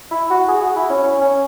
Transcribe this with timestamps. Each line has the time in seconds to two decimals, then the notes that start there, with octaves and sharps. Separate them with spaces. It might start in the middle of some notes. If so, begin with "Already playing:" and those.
0.11 E4
0.30 F#4
0.48 G#4
0.62 F#4
0.76 E4
0.90 C#4
1.03 C#4
1.21 C#4